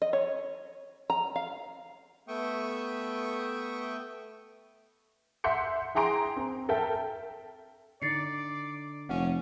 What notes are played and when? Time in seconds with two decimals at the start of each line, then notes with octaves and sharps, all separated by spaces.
0.02 D#5
0.13 C#5
1.10 A#5
1.36 F5
2.28 A3 B3 E5 G5 C#6 D#6
5.44 E5 F#5 C6 G6 C#7
5.95 E4 G#4 G5 A#5 C6 D7
6.37 C4
6.69 A4 A#4 E5 G5
8.02 D3 D#4 D5 A6 C7 C#7
9.09 F1 C#4 F#5